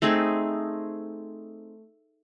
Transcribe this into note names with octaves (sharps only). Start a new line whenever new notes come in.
A3 C4 D#4 G#4